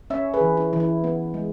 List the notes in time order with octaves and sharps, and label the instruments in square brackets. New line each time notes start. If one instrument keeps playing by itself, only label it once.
[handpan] C#4 C#5 E5
G#4 B4
E3
E4
E3
E4
B3
G#3